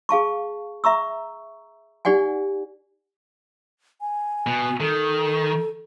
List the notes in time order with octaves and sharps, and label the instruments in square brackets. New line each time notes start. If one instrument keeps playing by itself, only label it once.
[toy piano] G#4 F5 A5 C#6
E5 A#5 C#6 E6
D#4 G4 D5 F#5 G#5
[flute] G#5
[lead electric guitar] B2
[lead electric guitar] D#3 [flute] A4